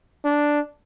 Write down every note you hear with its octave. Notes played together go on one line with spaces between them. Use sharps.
D4